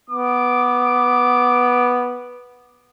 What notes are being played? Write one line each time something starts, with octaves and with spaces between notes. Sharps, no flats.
B3 D6